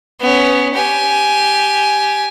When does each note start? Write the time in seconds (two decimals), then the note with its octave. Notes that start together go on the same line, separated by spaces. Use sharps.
0.21 B3 C#4
0.75 G4 G#5